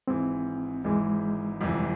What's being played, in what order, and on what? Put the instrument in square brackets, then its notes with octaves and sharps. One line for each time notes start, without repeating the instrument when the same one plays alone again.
[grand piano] G#1 G#2 E3 [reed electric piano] C4
[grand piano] G#1 G#2 E3 [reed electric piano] G#3
[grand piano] G1 F2 C3 E3